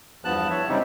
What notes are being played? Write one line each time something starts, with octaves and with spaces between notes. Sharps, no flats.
E2 G2 F3 B3 A5 F#6
C#5 E5
C#3 G3 G#3 C4 D#4 G4